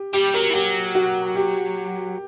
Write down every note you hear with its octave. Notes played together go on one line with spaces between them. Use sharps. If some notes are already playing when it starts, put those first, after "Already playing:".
Already playing: G4
G3 G4
F#3 A#4
E3
F#3 G4
F#4
G4